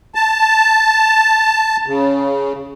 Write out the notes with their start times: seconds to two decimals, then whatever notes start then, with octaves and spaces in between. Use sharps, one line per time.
0.15 A5
1.87 C#3